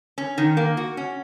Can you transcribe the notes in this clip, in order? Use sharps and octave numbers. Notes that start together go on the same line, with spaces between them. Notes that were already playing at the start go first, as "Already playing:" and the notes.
C#4
D#3
A#3
F#4
C#4